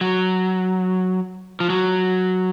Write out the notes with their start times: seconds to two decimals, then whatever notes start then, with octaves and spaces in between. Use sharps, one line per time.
0.01 F#3
1.60 F3
1.70 F#3